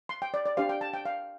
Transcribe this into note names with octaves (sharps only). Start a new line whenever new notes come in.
C6
G5
D5
D5
D4 G4 C5 F5
G5
A5
G5
F5